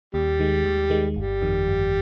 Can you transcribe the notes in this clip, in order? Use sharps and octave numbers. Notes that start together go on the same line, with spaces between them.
D#2 G3
D#3 G#3
D#2
D#3 G#3
G1 G3
F2 D#3
G1